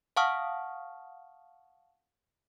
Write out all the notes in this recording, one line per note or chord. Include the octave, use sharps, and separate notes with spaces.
F5 F#5 A5 C#6 D#6 F6